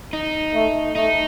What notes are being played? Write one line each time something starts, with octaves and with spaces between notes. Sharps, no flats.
D#4
A3
A3 D#4